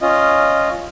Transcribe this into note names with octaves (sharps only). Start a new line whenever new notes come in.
C#4 F4 D#5